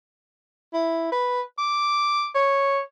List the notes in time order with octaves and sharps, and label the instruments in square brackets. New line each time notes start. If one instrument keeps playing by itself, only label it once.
[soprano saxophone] E4
B4
D6
C#5